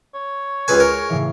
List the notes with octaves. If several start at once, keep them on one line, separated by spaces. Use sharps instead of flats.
C#5
C#2 G#4 B4 G#5 E7
A#4
A2 C#3 E3